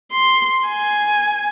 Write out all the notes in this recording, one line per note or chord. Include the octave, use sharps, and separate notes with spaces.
C6
G#5